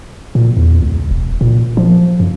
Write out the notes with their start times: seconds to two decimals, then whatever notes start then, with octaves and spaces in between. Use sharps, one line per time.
0.35 A#2
0.57 E2
0.82 C#2
1.11 E1
1.41 A#2
1.77 F3
2.20 F#2